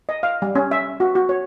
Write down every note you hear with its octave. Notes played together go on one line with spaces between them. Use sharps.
D#5
F5
G3
C#4
E5
F#4
F#4
C#5